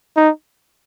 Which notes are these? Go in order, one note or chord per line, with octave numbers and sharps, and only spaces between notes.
D#4